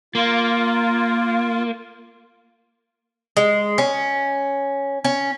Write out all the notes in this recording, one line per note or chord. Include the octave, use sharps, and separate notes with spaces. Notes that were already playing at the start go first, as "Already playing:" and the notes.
A#3 F4
G#3
C#4
C#4